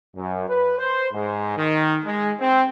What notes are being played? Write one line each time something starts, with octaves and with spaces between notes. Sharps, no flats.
F#2
B4
C5
G#2
D#3
G#3
C4